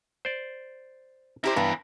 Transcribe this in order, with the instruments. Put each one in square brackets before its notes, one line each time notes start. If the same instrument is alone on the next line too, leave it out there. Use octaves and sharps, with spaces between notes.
[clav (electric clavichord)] C5 D5
[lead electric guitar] C4 A#4 [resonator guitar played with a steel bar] E4 G4 C5
[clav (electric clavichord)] G2 [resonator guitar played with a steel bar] E3 B3